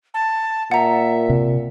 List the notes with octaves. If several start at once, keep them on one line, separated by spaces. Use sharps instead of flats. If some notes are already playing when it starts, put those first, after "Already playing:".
A5
A#2 E5 F#5 A#5
C3